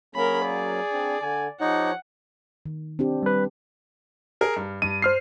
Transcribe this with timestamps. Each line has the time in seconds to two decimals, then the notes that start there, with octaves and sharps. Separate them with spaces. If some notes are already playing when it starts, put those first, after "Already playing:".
0.15 F#3 A#3 C#4 G#4 A#4 B5
0.46 D5
0.92 C4 D4
1.21 D3 G#5
1.61 F3 D#4 G4 C#5 F#5
2.66 D#3
2.99 C4 D4 G4
3.22 G3 B4
4.41 G#4 A#4
4.56 G2
4.82 G2 D#7
5.02 C5 F6 C7